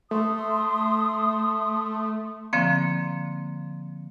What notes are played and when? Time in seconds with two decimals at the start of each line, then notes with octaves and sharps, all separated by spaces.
0.11 A3 C6 D#6
2.53 D3 F3 A#3 C4